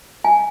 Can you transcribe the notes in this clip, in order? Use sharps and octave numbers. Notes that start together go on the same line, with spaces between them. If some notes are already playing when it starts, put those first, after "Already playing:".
G#5